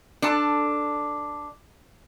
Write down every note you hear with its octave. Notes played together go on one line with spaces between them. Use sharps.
D4 A4 A5